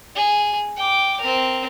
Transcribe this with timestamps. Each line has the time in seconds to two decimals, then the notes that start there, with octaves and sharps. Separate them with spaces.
0.15 G#4
0.77 G5 D6
1.20 C4 A#4